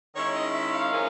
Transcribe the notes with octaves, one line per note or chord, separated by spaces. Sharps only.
D#3 G#3 C#4 E4 C#5
D#5
E5
F5
F3 A#3 C#4